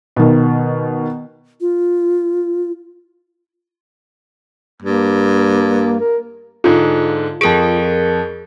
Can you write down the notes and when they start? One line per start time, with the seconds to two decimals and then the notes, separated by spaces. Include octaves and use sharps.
0.16 B2 D#3
1.61 F4
4.82 G2 A#3
6.00 A#4
6.64 G#2 D3 F4
7.41 F2 G#4 A#4 D7